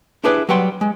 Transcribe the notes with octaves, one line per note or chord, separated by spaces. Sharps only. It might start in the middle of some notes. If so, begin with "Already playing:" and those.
D4 E4 G4 G#4 B4 D5
F#3 G3 B4 F#5 G5 C6
G#3